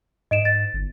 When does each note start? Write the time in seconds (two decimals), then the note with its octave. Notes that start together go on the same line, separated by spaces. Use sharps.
0.31 G#2 D#5 D7 E7
0.45 A6
0.74 G1